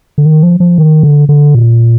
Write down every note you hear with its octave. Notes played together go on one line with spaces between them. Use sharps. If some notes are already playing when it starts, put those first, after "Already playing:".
D3
D#3
F3
F3
D#3
D3
D3
A#2